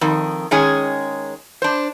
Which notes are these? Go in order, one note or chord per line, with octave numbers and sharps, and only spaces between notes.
F2 D#3
D#3 G#3 C#4 G#4
D4 C5